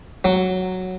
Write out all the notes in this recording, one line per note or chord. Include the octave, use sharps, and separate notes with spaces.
F#3